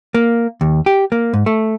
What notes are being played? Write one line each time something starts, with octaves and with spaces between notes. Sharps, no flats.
A#3
D#2
G4
A#3
G#2
A3